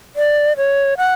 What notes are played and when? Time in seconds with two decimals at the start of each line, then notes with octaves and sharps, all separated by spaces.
0.16 D5
0.57 C#5
0.98 F#5